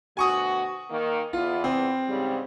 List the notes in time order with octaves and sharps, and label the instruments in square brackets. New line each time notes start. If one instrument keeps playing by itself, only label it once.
[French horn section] D2 B2 F#4 [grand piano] G#5 C#6 D#6
[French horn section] D#3 A#3
[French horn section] E2 B3 [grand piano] F4
[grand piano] C4
[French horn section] G#2 C#3 G3